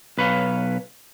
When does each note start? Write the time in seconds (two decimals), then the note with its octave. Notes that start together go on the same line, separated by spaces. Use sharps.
0.18 B1 B4 C#5 F5